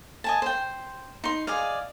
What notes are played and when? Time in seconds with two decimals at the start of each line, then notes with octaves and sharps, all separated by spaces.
0.24 D#5 G#5 A5
0.42 C5 G5
1.24 D#4 C6
1.47 G#4 D5 D#5 F5